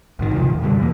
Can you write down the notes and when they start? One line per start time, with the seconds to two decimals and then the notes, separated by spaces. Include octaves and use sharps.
0.19 A#1 G#2 D#3
0.33 D#2 C3 D#3 F3
0.47 D1
0.62 F#2 B2 D3 G3
0.77 E2 E3 A#3